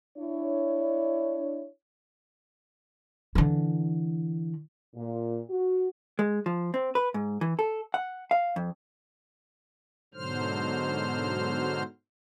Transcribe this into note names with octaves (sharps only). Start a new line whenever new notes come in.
D4 E4 C#5
D3 E3
A#2
F#4
G#3
F3
C4
B4
G#2
E3
A4
F#5
F5
F2
G#2 B2 D3 F#3 C5 F6